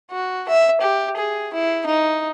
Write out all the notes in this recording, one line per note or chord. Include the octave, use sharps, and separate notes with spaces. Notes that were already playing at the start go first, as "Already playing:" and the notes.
F#4
E5
G4
G#4
E4
D#4